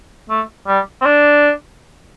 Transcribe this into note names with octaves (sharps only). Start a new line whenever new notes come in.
A3
G3
C4
D4